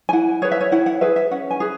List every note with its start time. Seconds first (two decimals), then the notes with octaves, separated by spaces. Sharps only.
0.09 G#5
0.13 E4 F#5
0.42 G#4 B4 C#5
0.52 E5
0.61 C#5
0.72 E4 F#5
0.86 F#5
1.01 G#4 B4 E5
1.16 E5
1.31 C#4 F#5
1.51 G#5
1.60 G#4 B4